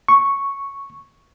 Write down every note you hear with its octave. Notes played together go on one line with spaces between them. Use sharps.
C#6